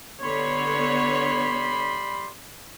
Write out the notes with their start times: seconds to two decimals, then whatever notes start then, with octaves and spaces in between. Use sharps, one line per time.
0.22 D3 G3 B3 C#5 B5 C6